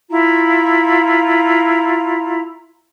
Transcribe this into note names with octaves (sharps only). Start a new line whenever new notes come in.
E4 F4 A#5